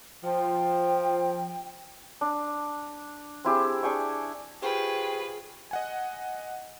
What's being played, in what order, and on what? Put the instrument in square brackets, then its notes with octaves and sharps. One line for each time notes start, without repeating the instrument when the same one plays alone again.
[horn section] F3 [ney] G5
[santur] D4
C4 E4 G4 G#4
D4 G#4 G5 C#6
[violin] F4 B4 [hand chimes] G4 C5 C#6 [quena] G#4 [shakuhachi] G5
[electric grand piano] D#5 F#5 G#5